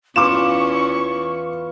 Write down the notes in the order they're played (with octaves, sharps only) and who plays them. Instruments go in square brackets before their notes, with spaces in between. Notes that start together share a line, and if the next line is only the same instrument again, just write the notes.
[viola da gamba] E2 E3 C#4 [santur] F4 B4 [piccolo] C#6 [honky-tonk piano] D6 E7